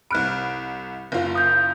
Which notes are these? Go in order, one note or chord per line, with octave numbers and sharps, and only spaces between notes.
C2 B5 F6 F#6 D7
F#1 F4
D#6 G6